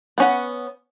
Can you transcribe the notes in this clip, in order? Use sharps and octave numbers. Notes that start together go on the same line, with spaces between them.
B3 C#4 F#5